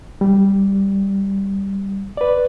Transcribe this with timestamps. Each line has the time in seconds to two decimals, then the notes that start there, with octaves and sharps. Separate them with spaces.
0.21 G3
2.17 B4 D5